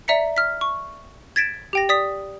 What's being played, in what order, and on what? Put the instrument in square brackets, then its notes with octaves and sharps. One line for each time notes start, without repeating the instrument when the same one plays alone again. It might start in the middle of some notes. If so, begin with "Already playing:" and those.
[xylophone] D5 E5 A#5 B6 C#7
F6 B6
C#6
G#6 A6 B6 D7 E7
G4 G5 A#6
D5 D#6 B6